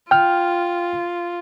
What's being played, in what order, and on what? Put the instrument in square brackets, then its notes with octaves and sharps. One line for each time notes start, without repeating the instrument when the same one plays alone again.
[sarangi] F4 [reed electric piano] G5 F6